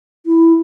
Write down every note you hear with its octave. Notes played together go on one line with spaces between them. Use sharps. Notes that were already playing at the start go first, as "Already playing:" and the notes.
E4